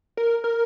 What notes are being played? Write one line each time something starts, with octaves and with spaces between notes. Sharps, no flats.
A#4
A#4